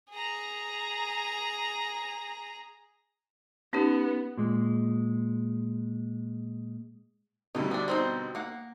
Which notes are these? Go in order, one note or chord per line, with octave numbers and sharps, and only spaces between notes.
G#4 A#5
B3 C#4 D#4 G4
A#2 G#3
B2 D3 G3 D#4 E4
B3 D4
C4 D#4 C5
A#3 F#5